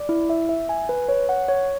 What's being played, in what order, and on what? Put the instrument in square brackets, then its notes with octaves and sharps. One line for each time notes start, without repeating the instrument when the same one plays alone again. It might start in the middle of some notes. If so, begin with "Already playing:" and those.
Already playing: [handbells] D5
E4
E5
E5
G#5
B4
C#5
F#5
C#5